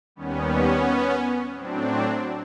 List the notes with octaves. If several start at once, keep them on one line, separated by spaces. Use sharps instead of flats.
D#2 D#3 G3 B3 C#4
A2 F#3 C4 D4